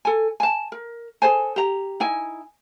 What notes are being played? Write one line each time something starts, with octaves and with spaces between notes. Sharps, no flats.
A4 G#5
G#5 A5
A#4
G#4 A4 C5 G#5
G4 A#5
D#4 E4 G#5